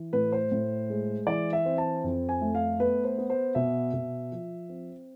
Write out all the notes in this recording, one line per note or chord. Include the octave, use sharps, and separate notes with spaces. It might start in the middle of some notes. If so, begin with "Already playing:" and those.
Already playing: E3
A2 B4
C5
A2
G#3
E3 D5
E5
C4
A5
F2
G#5
A3
F5
B3 B4
C5
B3
C5
B2 E5
B2
F3
C4